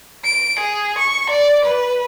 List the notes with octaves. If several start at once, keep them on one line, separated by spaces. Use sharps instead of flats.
D7
G#4
C#6
D5
B4